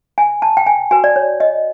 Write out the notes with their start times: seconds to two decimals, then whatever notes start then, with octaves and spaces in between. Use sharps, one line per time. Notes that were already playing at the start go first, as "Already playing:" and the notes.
0.18 G#5
0.42 A5
0.57 G5
0.66 G#5
0.91 F#4 B4 G#5
1.04 D5
1.16 C#5
1.40 D#5